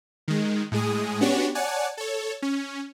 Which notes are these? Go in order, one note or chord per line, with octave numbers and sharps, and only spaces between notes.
D#3 G#3
A2 G#3 G#4 D#6
B3 C#4 D4 F#4 G4 C#5
C#5 D5 F#5 G#5 A5
A4 C#5
C#4